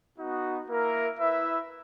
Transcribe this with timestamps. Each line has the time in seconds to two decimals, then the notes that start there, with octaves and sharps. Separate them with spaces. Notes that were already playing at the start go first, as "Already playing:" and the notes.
0.18 B3 D#4 F#4
0.68 A#3 E4 A#4 E5
1.18 E4 B4 E5